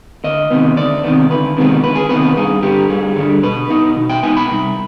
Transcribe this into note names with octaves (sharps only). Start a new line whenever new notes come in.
D2 D#5
C3 D#3 B3
D2 D5
C3 D#3 B3
D2 B4
C3 D#3 G#3 B3
D2 B4
G#4
C3 D#3 G#3 B3 B4
G2 G#4
D3 G3 G4
G2 G#4
D3 G3
B2 B4
B3 D#4
B2
G5
B3 D#4 G#5
B5
C2